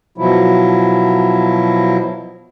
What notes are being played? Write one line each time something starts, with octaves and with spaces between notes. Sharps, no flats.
B2 F3 F#3 E4